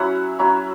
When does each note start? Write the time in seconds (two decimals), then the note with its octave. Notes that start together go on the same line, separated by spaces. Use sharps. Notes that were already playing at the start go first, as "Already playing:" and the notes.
Already playing: F#3 C#4 E4 F#5
0.39 F#3 C#4 E4